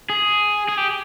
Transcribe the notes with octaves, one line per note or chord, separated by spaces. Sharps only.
G#4
G#4
G4